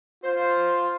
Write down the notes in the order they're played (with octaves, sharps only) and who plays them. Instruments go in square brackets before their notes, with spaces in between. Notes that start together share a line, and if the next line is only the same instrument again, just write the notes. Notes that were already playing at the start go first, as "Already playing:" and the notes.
[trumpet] F4 [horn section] C5